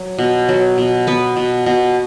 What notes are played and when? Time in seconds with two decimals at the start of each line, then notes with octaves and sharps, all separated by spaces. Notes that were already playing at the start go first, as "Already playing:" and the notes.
Already playing: F#3
0.18 B2
0.49 F#3
0.78 B2
1.07 B3 B4
1.37 B2
1.66 B2